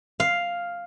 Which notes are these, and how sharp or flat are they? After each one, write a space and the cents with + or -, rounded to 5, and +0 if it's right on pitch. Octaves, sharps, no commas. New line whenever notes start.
F5 +0